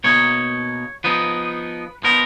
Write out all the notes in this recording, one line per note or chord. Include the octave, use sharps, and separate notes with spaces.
B2 A#3 D#4 C#5
F3 B3 D#4 B4
F3 B3 D#4 A#4